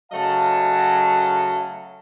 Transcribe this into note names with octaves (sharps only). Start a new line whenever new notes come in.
C#3 F#3 A3 D#5 F5 A5